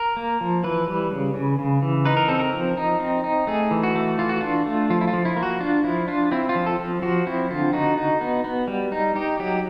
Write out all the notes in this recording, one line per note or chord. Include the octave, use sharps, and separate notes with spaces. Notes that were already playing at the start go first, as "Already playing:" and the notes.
Already playing: A#4
A#3
F3
E3 B4
G3
C#3
C#3
C#3
E3
D#4 B4
A#4
C4 A4
A#4
F3
D#4
C4
D#4
A3 G#4
E3
F#4
A3
E3 F4
F#4
D4 F4
A3
F3 F4
E4
F4
F3
E4
A#3
F#4
D4 F4
F3 E4
D4 F4
C4 E4
F4
F3
A4
F3
F3 F#4
C4 E4
D3 F4
D#4 F#4
D#4
B3
B3
G3
D#4
D#4 G4
F#3 G4